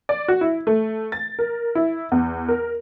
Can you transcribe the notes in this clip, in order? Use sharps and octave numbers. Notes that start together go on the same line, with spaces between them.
D5
F#4
E4
A3
A6
A#4
E4
E2
A#4